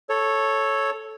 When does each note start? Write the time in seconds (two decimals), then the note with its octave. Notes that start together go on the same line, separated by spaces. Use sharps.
0.09 A4 C#5